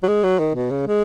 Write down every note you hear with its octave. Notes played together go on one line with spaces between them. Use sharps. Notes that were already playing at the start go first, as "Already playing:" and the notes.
F#3
G#3
F#3
D#3
B2
C#3
G#3